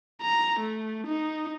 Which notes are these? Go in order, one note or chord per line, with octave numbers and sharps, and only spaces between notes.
A#5
A3
D#4